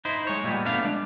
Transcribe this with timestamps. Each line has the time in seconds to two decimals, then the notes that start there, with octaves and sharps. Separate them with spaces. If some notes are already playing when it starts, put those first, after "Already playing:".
0.05 D#4 E4 C5
0.27 G#3 C#5
0.43 A#2 G3 G#3 B3
0.66 A3 B3 D4 F5
0.85 G#3 D4